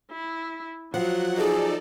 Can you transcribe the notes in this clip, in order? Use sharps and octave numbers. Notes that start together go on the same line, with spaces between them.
E4
F3 F#3 F#5
D#4 G#4 A4 D5